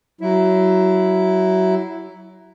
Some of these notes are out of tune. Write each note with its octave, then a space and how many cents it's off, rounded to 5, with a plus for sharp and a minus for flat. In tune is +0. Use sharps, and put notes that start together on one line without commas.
F#3 +20 E4 +0